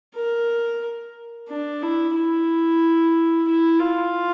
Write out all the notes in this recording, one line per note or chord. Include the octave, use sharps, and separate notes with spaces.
A#4
D4
E4
E4
E4
F4